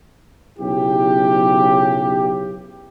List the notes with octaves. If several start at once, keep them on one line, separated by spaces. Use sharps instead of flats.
B1 C#3 E4 G4